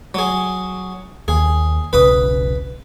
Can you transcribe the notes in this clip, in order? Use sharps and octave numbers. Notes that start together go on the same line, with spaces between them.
F#3 G#4
D#2 G#4
E1 B1 C#3 B4 B5 D#6